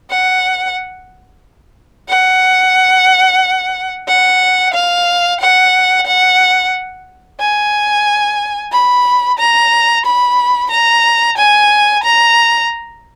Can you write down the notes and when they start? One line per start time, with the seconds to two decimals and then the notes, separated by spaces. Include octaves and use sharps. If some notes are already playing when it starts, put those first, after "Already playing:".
0.10 F#5
2.09 F#5
4.08 F#5
4.74 F5
5.40 F#5
6.07 F#5
7.40 G#5
8.72 B5
9.39 A#5
10.05 B5
10.71 A#5
11.37 G#5
12.03 A#5